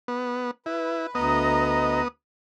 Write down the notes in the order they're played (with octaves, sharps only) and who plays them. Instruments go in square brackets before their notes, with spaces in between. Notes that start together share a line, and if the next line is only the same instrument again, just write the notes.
[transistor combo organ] B3
[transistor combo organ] E4 [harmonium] B4
[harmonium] D2 D#5 A#5 [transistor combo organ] B3 D#6